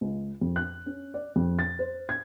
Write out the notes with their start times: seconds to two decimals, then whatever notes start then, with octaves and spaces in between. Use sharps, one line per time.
0.01 C#2
0.41 F2
0.56 F#6
0.86 C#4
1.14 D5
1.36 F2
1.59 A6
1.79 C5
2.09 G#6